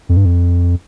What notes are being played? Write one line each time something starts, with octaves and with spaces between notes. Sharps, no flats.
F2
G2
F2